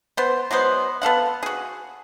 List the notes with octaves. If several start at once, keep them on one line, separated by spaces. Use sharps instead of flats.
B3 C5
F#3 G#3 B3 C5
B3 A4 F5 F#5
F#4 G#4